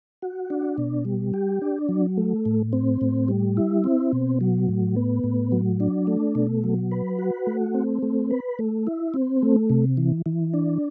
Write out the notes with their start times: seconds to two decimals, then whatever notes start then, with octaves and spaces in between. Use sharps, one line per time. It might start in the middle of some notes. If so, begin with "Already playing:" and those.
0.22 F#4
0.50 D4
0.78 B2
1.05 G3
1.34 G4
1.62 D4
1.89 F#3
2.17 A3
2.45 A2
2.73 C4
3.01 A2
3.28 G3
3.57 E4
3.84 C4
4.13 B2
4.41 F#3
4.68 A2
4.96 B3
5.24 A2
5.52 F#3
5.80 D4
6.07 A3
6.35 B2
6.64 F#3
6.92 B4
7.18 F#4
7.47 A3
7.74 C4
8.02 A3
8.31 B4
8.59 A3
8.87 E4
9.14 C4
9.43 A3
9.70 C3
9.97 E3
10.26 E3
10.54 D4